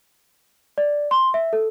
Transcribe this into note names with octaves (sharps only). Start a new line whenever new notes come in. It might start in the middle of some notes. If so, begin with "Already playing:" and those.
D5
C6
E5
A4